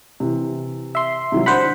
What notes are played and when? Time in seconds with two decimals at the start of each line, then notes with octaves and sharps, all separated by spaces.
0.20 C3 E3
0.95 E5 C6
1.32 C3 D#3 F#3
1.46 D4 F#4 C5 F#5 B5